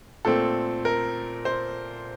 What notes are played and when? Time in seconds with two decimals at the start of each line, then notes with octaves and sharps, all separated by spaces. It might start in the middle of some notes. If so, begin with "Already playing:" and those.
0.25 A#2 A3 C4 A4
0.85 A#4
1.45 C5